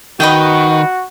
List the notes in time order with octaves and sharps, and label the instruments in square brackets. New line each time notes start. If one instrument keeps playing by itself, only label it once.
[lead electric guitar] D#3 [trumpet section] F#4 [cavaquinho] B4 D#5 G5